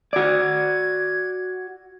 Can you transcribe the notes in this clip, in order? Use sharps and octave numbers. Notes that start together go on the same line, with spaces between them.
F#4 D5 G#6